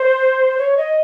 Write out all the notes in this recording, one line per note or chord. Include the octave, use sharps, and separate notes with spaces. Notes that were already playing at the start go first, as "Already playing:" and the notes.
Already playing: C5
C#5
D#5